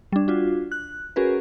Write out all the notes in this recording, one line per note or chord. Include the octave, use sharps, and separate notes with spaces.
G3 D4
D4 F4 F#4
F#6
C#4 F#4 G#4 A#4 B4